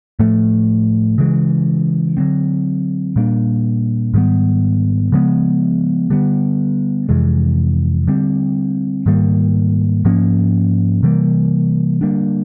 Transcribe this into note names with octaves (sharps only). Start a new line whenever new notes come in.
A2 F3 A3
C#3 E3 G#3
D3 F#3 A3 C4
A#2 G3 A#3 D4
G#2 D#3 G3 B3
C#3 F3 G#3 B3
D3 G3 B3
F2 C3 E3 G#3
D3 G3 C4
G#2 D#3 G3 A#3
G#2 F3 A#3 C#4
C3 E3 G3 A#3
D3 G3 A#3 D4